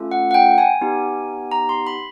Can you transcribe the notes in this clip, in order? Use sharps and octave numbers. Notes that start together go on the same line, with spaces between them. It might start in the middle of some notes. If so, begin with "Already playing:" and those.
Already playing: A3 C#4 F4 A4
F#5
F#5
G5
G#5
B3 D#4 G4
A#5
C6
B5